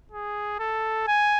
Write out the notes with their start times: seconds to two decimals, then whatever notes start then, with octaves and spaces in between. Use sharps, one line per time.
0.11 G#4
0.59 A4
1.08 G#5